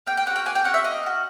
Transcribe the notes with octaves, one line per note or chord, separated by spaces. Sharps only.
A#3 G5
G5
C#4 F#4 F#5
G5
A#3 G#5
G5
C#4 F#4 F#5
E5
A#3 D#5
C#4 F#4